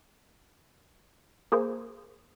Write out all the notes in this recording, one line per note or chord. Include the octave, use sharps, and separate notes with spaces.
A#3 G#4 A#4 C5